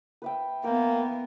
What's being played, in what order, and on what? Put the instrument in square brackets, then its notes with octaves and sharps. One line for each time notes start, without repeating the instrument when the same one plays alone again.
[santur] B4 E5 G5
[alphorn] A#3 [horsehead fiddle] B3 [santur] G5